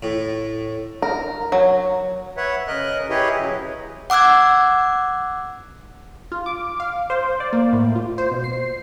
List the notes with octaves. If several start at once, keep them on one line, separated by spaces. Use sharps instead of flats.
A2
A#4
F#3
B4 C#5 E5 F#5
C#3 A#4 D#5 F#6
E4 G4 G#4 B4 C#5 D#5
C#3 F#3
F#5 D6 E6 F#6 G#6
F4
D6
F5
C5
D5
A#3
A2
F4
C5
B2
C7